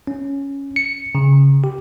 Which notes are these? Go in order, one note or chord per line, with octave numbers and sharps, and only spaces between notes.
C#4
C#7
C#3
G4